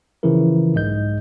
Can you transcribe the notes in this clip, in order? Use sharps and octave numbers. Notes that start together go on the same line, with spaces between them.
C#3 E3 F3 E4 A#4
B1 G#2 D#5 G6